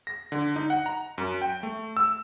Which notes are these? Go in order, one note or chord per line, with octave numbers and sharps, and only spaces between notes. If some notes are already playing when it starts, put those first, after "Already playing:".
A#6
D3
D#4
F#5
A#5
F#2
G5
A3
E6